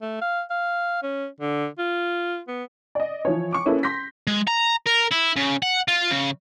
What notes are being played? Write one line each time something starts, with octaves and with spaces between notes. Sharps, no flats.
A3
F5
F5
C#4
D3
F4
B3
D5 D#5
E3 F3 C#5
C#6 D6
A#3 C#4 E4 G#4 A4 B4
C6 G6 A#6 B6
G#3
A#5
A#4
E4
C#3
F#5
F4
C#3